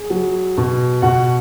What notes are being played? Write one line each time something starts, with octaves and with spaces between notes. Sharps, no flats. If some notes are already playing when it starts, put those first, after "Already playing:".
Already playing: G#4
F#3
B2
B2 F#4 F#5